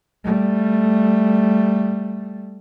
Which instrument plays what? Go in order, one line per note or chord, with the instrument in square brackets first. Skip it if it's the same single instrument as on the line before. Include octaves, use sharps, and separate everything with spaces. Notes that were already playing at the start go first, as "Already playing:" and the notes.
[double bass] G3 A3